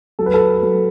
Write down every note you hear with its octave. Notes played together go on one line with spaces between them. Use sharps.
F#3 A4
B4
A4
F#3